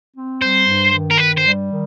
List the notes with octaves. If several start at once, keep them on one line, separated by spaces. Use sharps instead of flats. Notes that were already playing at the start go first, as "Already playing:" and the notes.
C4
G3 C5
G2
D#3
A#4
G2 B4
C5
G3
D#3